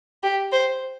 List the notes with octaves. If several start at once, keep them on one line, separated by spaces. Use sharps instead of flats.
G4
C5